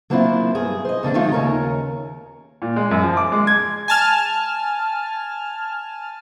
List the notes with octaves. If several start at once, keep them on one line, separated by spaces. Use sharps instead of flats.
F#3 A#3 C4 D4 E4 F4
G2 G#4
C5 D#5
F2 D3 A#3 D4
D#3 F#3 G#3 A3 D#4 F4
D#2 C#3 A#4 C#5 A#5
A#2
G#3
F#2
F3
D6
G#3
G#6
G#5 A5 F6